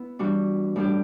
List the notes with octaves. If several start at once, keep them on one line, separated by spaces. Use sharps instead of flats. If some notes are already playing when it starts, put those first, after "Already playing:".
Already playing: B3 E4
E3 G3 D4 F#4
A2 G3 D4 G4